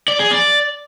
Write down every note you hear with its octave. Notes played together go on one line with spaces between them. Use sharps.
D5
G#4
D5